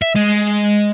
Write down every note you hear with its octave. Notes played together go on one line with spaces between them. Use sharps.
E5
G#3